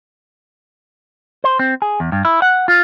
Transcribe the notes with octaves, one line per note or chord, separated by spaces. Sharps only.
C5
C4
G#4
E2
G2
E4
F#5
F4